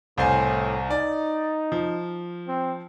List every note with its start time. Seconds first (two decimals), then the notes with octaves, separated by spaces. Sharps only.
0.18 C2 A2 C5 G#5
0.90 D#4 D5
1.72 F3
2.48 C4